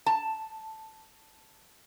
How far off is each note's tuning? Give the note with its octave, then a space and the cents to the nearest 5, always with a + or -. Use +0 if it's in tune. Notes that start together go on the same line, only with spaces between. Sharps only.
A5 +0